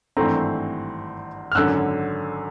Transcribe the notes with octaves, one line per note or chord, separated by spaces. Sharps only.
G#1 G2 E3 A3 C4 A#5 C6
F6
G#1 F#2 D3 E6 F#6